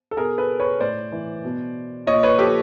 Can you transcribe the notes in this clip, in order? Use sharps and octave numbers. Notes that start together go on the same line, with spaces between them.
A4
B2 G#4 A#4
A4 B4
B4 C#5
A2 C5 D5
E3
B2
A#2 C#5 D#5
B4 C#5
F3 G4 A4